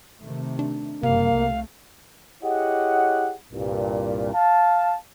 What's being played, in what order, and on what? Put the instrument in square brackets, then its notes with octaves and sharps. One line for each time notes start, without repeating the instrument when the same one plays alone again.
[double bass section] C3 D#3 A3
[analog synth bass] D4
[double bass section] F#1 G3 [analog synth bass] C3 [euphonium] A#3 [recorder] F5
[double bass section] C2 A3
[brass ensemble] E4 G4 G#4 C#5 D#5 F#5
C2 G2 A#2
F5 A5